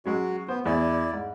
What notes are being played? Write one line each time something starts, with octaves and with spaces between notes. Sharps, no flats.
F#3 G#3 C#4 F#4
B3 C5
E2 E4 D5
G#2